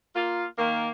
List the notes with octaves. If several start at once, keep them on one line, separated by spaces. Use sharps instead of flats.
A#3 F4
D#3 A#3